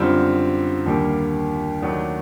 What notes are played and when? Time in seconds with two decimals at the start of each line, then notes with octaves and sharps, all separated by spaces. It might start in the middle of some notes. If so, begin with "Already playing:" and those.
Already playing: F#2 D3 G3 C4 F4
0.86 D#2 D3 G3 A#3
1.82 D#2 D#3 F#3 A3 D4